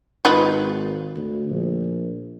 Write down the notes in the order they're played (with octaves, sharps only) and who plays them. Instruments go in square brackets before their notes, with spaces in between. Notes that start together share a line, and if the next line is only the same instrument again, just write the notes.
[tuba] G#1 [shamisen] D#4 F4 B4
[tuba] D2
A#1